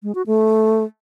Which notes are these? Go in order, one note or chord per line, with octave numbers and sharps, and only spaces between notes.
G#3
F#4
A3